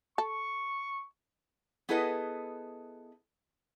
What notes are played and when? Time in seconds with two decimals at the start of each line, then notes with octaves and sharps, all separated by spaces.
0.18 A4 C#6
1.89 B3 E4 G#4 A4 B4 D#5